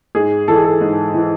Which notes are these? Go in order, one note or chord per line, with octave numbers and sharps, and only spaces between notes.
G#2 G#4
E3 A4
G#4
A4
G#2
E3